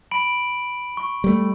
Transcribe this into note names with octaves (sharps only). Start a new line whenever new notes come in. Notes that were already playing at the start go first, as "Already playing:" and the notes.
B5 D7 F#7
C#6
G3 A3